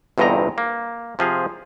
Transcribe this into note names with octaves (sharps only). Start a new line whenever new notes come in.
G1 E2 G2 C3 D#5 A#5
A#3
C3 F3 G#4 F5